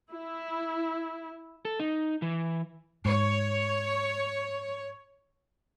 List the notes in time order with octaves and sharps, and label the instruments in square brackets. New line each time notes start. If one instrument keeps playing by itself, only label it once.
[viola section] E4
[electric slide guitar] A4
D#4
E3
[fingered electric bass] G#2 [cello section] C#5